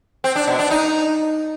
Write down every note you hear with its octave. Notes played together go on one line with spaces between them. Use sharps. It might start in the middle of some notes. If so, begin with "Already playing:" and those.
C4
D4
B2
D4
D#4